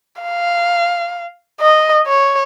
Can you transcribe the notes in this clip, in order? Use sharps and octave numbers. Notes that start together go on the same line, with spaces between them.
F5
D#5
C#5